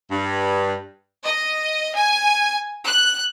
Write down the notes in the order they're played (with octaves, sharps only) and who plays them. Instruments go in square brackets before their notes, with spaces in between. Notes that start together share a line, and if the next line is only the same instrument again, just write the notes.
[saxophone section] G2
[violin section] D#5
G#5
F#6